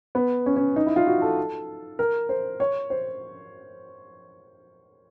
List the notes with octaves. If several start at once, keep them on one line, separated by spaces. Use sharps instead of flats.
B3
C#4
C#4
D#4
E4
F4
F#4
A4
A#4
C5
C#5
C5